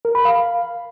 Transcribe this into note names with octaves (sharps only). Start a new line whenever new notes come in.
A#4
B5
F5